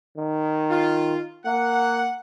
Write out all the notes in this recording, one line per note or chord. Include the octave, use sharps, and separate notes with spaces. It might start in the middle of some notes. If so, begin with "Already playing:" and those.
D#3
F4
A#3 F#5